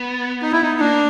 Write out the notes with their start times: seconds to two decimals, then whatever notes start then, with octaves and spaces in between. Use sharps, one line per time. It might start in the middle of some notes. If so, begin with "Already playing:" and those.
Already playing: B3
0.42 D#4
0.52 E4
0.62 D#4
0.80 A#3 D4